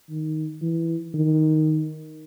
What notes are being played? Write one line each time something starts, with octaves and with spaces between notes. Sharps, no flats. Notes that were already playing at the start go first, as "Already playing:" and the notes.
D#3
E3
D#3